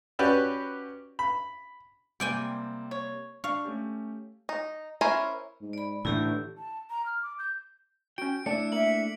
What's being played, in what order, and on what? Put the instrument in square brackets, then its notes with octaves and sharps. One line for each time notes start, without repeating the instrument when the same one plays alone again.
[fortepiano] C#4 F#4 G4 B4 D5
B5
[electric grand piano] C3 G3 A#3 [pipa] C4 [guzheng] D5 G5 G#5
[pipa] C#5
[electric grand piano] D4 [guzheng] F5 [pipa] C#6
[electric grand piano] A3 C#4 G4
[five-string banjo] D#4
C#4 E4 A#4 C5 G#5
[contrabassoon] G#2
[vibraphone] D5 B5
[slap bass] A2 E3 [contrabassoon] D3 [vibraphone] E4 G4
[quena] A5
A#5
F6
D6
G6
[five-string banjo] C#4 F#4 [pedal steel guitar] G5 [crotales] D7
[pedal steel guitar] A3 D4 E4 [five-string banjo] D5 A5 [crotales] C#7
[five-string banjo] A#3 [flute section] E5 [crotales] F#7